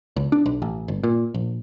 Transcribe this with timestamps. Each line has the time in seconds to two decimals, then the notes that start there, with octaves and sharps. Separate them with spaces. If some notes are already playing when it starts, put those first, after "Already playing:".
0.16 C#2
0.32 D4
0.46 B1
0.62 A1
0.88 G1
1.04 A#2
1.34 A#1